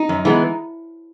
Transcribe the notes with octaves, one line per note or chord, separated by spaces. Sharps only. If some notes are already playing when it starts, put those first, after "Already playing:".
Already playing: D#4
F#2
E3 G#3 B3